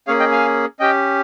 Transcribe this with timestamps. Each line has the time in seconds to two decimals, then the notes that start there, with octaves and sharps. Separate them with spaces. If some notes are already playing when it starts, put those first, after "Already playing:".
0.07 A#3 C#4 G#4 C#5 F5
0.19 D#5 G5
0.32 F5 G#5
0.80 C#4 G4 D#5 G5